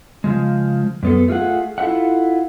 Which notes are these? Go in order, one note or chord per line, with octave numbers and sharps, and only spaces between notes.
C#3 F3 G#3
F#2 B3 A4
A3 F4 G#4 F#5
E4 F4 A4 E5 F#5